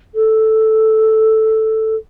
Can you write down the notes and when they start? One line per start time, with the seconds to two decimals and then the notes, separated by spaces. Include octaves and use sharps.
0.14 A4